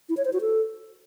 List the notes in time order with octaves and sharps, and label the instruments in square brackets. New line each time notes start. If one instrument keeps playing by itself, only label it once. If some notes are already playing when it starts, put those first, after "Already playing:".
[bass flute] E4
C#5
C5
F#4
A4